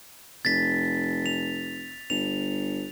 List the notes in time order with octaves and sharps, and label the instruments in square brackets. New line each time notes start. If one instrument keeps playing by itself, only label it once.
[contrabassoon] F1 [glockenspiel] A6 B6
[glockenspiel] F7
[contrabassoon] G1 [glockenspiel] F7